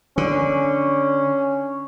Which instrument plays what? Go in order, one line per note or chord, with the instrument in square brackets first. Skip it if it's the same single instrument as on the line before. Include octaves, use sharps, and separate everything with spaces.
[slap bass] D3 [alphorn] C#4